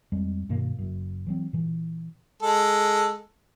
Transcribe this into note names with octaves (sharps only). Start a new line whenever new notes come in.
F2 G3 G#3
G2 B2 D#3 A#3
F#1 F#2
E3 F#3 C4
A#2 E3
G#3 A4